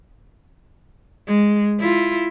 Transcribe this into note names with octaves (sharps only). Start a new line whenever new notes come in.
G#3
E4 F4